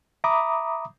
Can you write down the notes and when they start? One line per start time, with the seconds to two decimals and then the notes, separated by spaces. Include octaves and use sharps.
0.24 E5 A#5 B5 D6 D#6